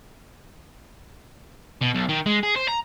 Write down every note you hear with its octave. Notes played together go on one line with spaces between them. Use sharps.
B2
B1
D#3
G#3
G#4
C5
A#5